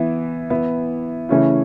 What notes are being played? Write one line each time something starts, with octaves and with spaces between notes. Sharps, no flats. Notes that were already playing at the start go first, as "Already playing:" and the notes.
Already playing: E3 B3 E4
E3 B3 E4
C#3 E3 A3 C#4 E4